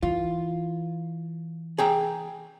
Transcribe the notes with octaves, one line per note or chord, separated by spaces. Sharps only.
E3 F4
G#4 G5 A#5